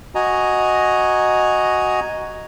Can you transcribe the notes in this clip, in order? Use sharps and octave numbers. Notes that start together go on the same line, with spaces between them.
F#4 D#5 G#5 A#5